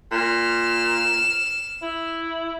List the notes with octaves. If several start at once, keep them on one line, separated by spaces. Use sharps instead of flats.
A#2 F6 E7
E4